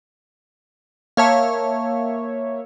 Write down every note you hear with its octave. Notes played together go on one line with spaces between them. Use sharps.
A#3 C#5 E5 F5 A5